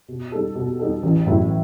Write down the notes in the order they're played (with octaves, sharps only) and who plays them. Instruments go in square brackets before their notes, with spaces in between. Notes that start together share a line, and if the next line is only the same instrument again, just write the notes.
[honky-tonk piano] B2
G3 D#4 A4
B2
G3 D#4 A4
A1
A2 F#3 A3 E4